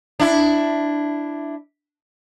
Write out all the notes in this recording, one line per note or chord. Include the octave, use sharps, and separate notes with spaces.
D4 E4